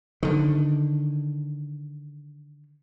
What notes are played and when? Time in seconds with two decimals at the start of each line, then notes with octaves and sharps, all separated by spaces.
0.23 D3 D#3